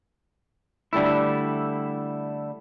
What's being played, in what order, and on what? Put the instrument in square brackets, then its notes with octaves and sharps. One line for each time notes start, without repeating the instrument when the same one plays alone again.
[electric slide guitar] D3 G3 A3 E4